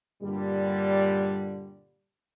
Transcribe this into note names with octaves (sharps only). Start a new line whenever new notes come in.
G2 A#2 D3 G3